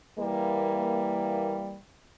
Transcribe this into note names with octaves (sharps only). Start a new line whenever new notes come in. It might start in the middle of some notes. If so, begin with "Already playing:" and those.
E3 G3 A#3